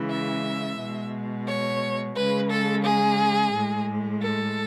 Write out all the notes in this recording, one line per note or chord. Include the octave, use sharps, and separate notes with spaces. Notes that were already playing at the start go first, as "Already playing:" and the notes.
Already playing: C#3 E3 G#3
E5
B2 G#3
C#5
C#3 G#3 B4
A4
G#4
A2 G#3
A4